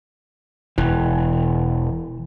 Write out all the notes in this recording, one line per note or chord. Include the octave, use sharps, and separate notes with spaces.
E1 E3